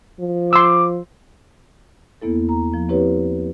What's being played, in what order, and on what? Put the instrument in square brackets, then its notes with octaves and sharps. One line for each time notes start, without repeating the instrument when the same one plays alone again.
[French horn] F3
[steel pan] C6 E6 [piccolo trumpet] D6
[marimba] E2 A#3 B3 E4 A4
A#5
F3
C4 E4 G4 B4 C#5